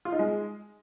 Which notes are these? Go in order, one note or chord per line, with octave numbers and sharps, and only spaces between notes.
F4
D#4
G#3